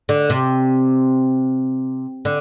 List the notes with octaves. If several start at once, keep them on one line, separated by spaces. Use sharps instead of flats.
D3
C3
D3